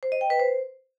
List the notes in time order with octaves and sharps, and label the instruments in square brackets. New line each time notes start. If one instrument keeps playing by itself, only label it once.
[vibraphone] C5
D#5
G5
B4
C5